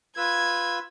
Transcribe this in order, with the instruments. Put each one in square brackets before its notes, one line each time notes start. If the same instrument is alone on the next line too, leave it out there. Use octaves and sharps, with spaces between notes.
[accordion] F4 B4 E6 [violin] G#6